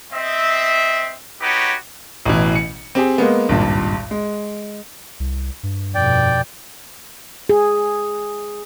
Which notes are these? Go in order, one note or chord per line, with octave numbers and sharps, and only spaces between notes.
C4 D#5 E5
B3 D#4 F#4 G4 B4 C#5
A1 B2 E3
C#7
C4 G4 G#4
G#3 A#3 B3
G#1 C#2 G2 A#2
G#3
C2
G2
F2 B2 D5 G5
G#4